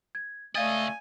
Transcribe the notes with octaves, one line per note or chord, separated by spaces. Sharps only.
G#6
C#2 A3 D5 D#5 F5 G#5 A6